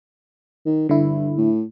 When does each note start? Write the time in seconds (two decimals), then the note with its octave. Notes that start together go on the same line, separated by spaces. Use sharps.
0.66 D#3
0.89 G2 D3 E4
1.37 A2